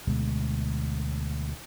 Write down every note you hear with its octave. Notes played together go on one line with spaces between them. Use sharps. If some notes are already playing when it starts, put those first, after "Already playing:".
D2 B2 G#3 B3